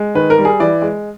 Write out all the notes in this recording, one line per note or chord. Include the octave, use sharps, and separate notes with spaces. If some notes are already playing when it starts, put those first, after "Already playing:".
Already playing: G#3
D#3 B4
A#4
G3
G#4
E3 D5
G#3